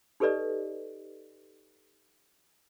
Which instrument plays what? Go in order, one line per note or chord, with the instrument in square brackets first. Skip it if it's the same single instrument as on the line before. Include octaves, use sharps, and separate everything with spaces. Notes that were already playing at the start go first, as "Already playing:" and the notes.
[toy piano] D#4 G4 A4 B4 D5 D#5